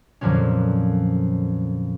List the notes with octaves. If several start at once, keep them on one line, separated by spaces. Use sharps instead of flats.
F2 A#2 D3 F3 F#3 C#4